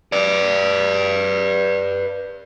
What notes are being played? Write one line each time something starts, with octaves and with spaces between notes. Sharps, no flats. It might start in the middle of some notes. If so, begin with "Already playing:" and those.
B4 D5